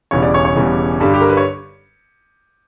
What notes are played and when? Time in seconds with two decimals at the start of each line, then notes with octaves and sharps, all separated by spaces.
0.11 E1 E2 C#3 E3 G3 C#5
0.23 D5
0.34 C#5
0.45 C#5
0.55 E1 E2 C#3 E3 G3
1.00 G2 D3 G3
1.14 G4
1.21 A#4
1.29 B4
1.37 C#5